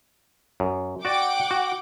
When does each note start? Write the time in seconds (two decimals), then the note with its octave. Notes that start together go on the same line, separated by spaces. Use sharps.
0.60 F#2
1.05 F#4 D5 F#5 G5 D6
1.51 F#4